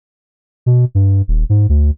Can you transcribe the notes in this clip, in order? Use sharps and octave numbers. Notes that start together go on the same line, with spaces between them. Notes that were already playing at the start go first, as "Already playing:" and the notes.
B2
G2
D#1
G#2
D2